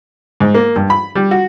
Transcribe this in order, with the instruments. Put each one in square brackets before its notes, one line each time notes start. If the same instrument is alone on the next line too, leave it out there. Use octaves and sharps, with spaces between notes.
[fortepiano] G#2
A#3
G2
B5
G3
F#4